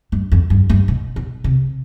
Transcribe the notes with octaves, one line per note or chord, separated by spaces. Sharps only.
G2
F2
G2
G2
B2
B2
C3